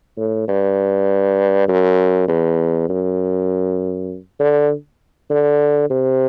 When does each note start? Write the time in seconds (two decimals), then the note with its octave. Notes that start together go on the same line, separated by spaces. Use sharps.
0.17 A2
0.48 G2
1.68 F#2
2.28 E2
2.89 F#2
4.40 D3
5.30 D3
5.90 C3